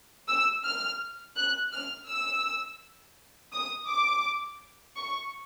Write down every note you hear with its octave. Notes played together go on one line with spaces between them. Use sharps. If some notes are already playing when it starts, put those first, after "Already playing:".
E6
F6
F#6
F6
E6
D#6
D6
C#6